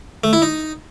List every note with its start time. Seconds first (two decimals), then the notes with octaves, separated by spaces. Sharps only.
0.24 A3
0.33 E4
0.42 D#4